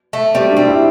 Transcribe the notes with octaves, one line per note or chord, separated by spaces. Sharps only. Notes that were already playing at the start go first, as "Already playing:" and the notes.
A3
G3 C4
D4
C4
E4